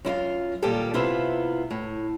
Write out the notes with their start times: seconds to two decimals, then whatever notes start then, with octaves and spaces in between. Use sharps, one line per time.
0.05 F#2 E4 F4 F5
0.62 A#2 D#3 G3 F4 G4 A4
0.93 C3 B3 E4 F4 E5 F5
1.71 A2